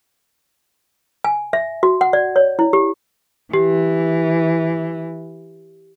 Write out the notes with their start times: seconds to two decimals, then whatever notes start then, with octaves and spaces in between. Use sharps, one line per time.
1.24 G#5
1.53 E5
1.83 F#4
2.01 F#5
2.13 D5
2.36 C#5
2.59 E4
2.73 G4
3.53 E3 G4